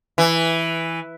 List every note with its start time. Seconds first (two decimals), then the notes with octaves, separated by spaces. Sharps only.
0.18 E3